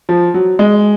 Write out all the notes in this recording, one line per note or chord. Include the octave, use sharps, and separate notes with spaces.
F3
F#3
G#3